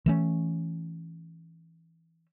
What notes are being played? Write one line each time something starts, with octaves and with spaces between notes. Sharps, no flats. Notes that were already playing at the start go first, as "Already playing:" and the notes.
E3 A3 C#4